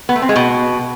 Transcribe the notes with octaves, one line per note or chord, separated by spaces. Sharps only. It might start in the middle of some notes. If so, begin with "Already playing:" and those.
B3
A3
C4
G#3
B2